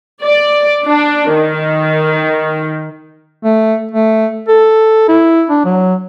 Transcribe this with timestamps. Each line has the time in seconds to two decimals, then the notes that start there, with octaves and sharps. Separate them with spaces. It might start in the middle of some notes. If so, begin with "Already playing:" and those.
0.22 D5
0.84 D4
1.33 D#3
3.44 A3
3.91 A3
4.48 A4
5.08 E4
5.50 D4
5.65 F#3